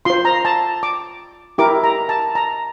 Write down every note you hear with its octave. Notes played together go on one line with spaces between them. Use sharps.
F4 C5 C6
A#5
A5
D6
E4 G4 A#4 D6
A#5
A5
A#5